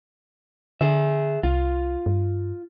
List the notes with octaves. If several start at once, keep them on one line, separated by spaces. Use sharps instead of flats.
D3 G#4 E5
C2 F4
G2